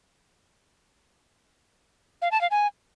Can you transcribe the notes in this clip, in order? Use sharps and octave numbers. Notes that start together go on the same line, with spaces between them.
F5
A5
F5
G#5